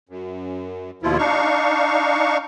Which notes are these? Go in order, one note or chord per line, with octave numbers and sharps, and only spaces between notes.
F#2
D#2 B2 F3 E4 F4
D4 D#4 F5 C#6